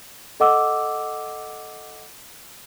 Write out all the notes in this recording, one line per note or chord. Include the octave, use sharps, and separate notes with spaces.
A4 D#5 F#5 D6 E6